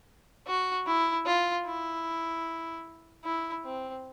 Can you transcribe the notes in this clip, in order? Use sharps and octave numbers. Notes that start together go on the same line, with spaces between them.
F#4
E4
F4
E4
E4
C4